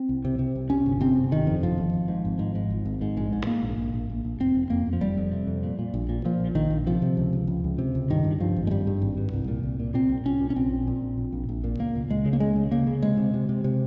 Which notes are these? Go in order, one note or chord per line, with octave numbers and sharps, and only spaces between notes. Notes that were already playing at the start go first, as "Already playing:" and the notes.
Already playing: C4
C2
C3
C3
C2
C3 C#4
G1
C3 C4
G1
G1 D#3
F2
G1 F3
G1
G#1
G#2
G#1
G#2
G#2
G#1
G#1
G#2
A#1 G#3
G#2
G#2 A#3
A#1
A#1
A#1
A#1
A#1
F1 C4
F1
F2 A#3
F2
F3
F1 G3
F2
C3
F2
A#2
A#2
A#1
A#2
A#2 F3
A#1
A#1 D#3
A#1
C3 F3
C3
C#2
C#2
C#2
C#2
C3
C#2
G2 D#3
G2
G2 F3
G#1
G#3
G2 G3
G2
G#1
G2
C2
A#2
C2
A#2
A#2 C4
C2
C2 C#4
A#2
C#4
A#1 C4
A#2
A#2
A#1
A#1
A#1
A#1
A#2
C#2 A#3
C#2
C#2 G#3
C#3
A#3
C#2 G#3
C#3
C#3 A#3
C#3
C3 G#3
C3
C3
C3
C3